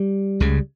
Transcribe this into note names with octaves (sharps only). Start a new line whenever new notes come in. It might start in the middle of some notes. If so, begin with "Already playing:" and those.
Already playing: G3
C#2 C#3